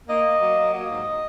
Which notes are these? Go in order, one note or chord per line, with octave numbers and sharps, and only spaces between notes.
A#3 D#5
A#3
F#3
A#3
F#3 D#5
G#2